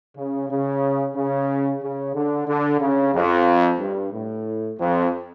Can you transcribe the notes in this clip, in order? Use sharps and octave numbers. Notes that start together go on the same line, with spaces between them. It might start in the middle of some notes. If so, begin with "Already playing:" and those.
C#3
C#3
C#3
C#3
D3
D3
C#3
F2
G2
A2
F2